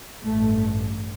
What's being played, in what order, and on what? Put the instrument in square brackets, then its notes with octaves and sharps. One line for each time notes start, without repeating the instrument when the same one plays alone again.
[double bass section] A1 G2 A3